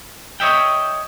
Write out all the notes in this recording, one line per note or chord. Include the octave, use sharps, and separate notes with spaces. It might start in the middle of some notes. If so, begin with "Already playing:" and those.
C#5 D#5 E5 G5